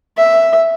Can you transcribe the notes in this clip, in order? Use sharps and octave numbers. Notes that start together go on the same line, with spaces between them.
E5